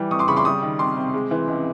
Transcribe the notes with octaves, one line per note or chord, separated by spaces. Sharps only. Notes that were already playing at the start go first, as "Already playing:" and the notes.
Already playing: E3 G3 D6
F2 C#6 D#6
C6 D6
C#3 B5 C#6
C6 D6
G3 C#6 D#6
D#3
C2 C6 D6
C3
G#3
E3
C#2